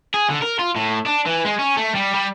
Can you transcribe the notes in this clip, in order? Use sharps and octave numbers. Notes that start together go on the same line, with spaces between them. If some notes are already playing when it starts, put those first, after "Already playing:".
G#4
D3
A#4
F4
A2
D4
E3
G#3
C#4
A3
G3
G3